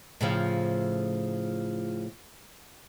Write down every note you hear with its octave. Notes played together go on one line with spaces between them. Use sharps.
A2 C#3 F3